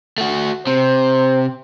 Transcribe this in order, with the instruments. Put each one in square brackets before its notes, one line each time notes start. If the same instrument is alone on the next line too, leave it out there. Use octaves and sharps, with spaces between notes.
[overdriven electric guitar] A3 F#4
[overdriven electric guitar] C3 [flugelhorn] C5